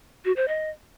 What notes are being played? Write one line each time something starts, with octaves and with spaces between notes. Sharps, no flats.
F#4
C5
D#5